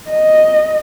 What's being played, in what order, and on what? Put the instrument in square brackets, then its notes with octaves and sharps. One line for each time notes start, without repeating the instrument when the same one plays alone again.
[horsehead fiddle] D#5